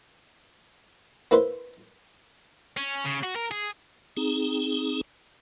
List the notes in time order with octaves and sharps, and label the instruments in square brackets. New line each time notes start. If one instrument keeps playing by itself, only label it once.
[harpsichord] A#3 E4 B4 C5
[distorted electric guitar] C#4
C#3
F#4
A#4
G#4
[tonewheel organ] C4 D#4 G#4